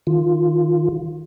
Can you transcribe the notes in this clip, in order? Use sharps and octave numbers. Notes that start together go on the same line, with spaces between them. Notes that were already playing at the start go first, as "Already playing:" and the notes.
D#3 F4